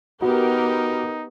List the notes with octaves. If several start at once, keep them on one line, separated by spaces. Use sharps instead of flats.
B3 D#4 F#4 G4 A#4